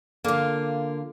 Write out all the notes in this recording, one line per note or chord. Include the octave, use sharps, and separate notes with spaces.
D3 A#3 F4